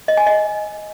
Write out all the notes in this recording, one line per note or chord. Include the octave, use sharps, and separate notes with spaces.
D#5
G#5
D#5